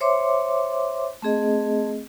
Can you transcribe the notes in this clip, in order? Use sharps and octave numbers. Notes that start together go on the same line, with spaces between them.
C5 C#5 E5 C6 D6
A3 C4 G#4 D#5